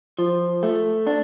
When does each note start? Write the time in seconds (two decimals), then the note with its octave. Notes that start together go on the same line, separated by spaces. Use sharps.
0.19 F3
0.63 A3
1.07 D4